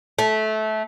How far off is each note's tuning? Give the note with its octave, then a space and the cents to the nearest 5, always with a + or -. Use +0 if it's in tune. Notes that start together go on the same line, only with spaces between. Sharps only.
A3 -20